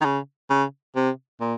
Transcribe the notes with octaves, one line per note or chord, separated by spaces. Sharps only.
D#3
C#3
C#3
C3
A#2